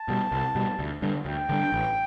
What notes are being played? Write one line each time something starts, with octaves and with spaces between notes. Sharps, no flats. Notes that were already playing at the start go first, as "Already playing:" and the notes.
Already playing: A5
B2 G3
C2
B2 G3
D2
D3 G3 D4
D2 G5
D3 G3 D4
A1